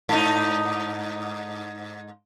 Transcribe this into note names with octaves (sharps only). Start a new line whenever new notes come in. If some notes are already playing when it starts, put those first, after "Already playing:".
G#2 D#4